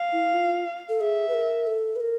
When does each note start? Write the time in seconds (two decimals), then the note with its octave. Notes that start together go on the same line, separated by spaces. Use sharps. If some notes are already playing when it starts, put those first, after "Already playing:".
Already playing: F5
0.13 E4
0.34 F4
0.89 A4
1.01 G#4 E5
1.28 B4
1.34 A#4
1.67 A4
1.96 B4
2.00 A#4